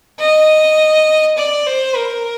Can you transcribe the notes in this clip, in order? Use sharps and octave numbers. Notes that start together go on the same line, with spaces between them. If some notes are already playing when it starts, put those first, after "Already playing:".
D#5
D5
C5
A#4